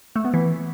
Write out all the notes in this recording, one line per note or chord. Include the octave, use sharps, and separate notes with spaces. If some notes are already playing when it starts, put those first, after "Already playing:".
A3
B3
E3